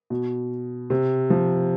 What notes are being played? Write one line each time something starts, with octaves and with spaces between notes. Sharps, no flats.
B2
C3
F3